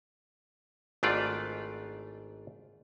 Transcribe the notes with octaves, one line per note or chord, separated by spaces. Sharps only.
G#1 G#2 A3 D4 F4 D5